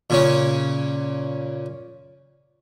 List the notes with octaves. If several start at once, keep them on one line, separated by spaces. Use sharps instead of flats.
A#2 C#3 C#4